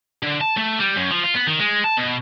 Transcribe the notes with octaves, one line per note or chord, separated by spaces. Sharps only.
D3
A5
A3
G3
F#2
F3
F4
B3
D#3
G#3
A5
B2